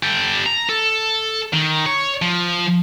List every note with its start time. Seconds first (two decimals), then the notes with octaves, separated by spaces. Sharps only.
0.03 G4 A4
0.46 A#5
0.69 A4
1.53 D#3
1.86 C#5
2.22 F3